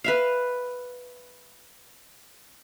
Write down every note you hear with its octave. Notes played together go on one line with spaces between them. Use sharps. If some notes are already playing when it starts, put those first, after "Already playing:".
B4 E5 F5